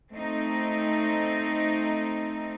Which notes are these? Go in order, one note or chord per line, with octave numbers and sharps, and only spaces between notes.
A3 C4 D#4